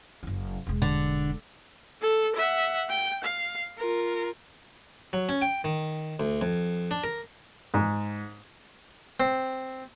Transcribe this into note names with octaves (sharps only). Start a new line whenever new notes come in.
F#1 E4
E1 G#3
D3
A4
E5 F#5
G5
F5
F4 A#4
F#3
C#4
G5
D#3
D2
F2
D4
A#4
G#2
C4